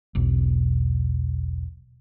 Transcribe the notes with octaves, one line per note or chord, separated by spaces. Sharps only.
E1 B1